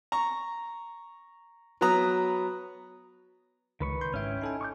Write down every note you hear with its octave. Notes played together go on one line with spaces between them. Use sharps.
A#5 C#6
F#3 B3 B4 A#5 D#6
C#2 D#3 B4 C#6
C#3 C6 G6
G#1 G#2 C#4 E4 E5 G5
D#4 A4 G#5
C#6 D6 G6